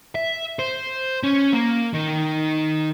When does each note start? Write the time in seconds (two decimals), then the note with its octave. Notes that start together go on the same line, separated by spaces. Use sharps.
0.15 E5
0.59 C5
1.23 C#4
1.53 A#3
1.94 D#3